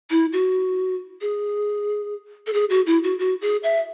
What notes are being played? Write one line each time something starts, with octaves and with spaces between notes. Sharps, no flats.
E4
F#4
G#4
A4
G#4
F#4
E4
F#4
F#4
G#4
E5